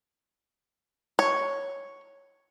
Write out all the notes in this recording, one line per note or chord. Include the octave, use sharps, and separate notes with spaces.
C#5